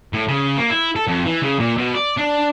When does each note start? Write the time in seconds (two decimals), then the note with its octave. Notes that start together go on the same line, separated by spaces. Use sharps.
0.13 A2
0.28 C#3
0.57 A#3
0.70 E4
0.96 A4
1.08 F2
1.25 E3
1.42 C#3
1.59 A#2
1.78 B2
1.95 D5
2.18 D4